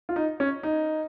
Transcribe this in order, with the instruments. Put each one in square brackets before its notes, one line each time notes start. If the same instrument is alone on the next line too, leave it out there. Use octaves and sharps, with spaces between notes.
[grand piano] F4
D#4
C#4
D#4